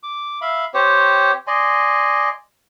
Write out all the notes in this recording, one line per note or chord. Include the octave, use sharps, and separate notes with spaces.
D6
E5 F5 B5
C4 G4 C5 C#5
D5 D#5 G#5 C6